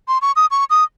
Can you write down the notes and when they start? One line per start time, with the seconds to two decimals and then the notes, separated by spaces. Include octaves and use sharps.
0.08 C6
0.22 C#6
0.36 D#6
0.51 C#6
0.70 D#6